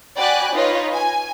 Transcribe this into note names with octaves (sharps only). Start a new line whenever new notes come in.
F#4 D5 G5 G#5 B5 F#6
D#4 F4 B4 C#5 D#5
G#5